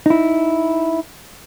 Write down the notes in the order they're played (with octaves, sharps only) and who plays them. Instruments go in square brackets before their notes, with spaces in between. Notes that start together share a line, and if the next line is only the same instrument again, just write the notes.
[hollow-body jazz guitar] D#4 E4